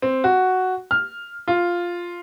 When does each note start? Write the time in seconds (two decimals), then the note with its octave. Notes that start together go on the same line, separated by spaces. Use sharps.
0.02 C4
0.24 F#4
0.91 F6
1.48 F4